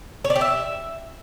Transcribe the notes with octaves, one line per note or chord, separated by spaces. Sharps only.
C#5
D5
G4
E5